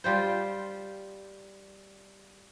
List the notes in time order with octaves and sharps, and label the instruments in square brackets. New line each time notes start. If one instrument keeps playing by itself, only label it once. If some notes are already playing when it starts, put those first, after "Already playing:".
[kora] G3 F4 C5